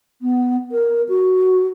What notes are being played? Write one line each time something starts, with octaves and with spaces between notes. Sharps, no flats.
B3
A#4
F#4